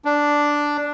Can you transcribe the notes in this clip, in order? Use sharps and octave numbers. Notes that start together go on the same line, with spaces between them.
D4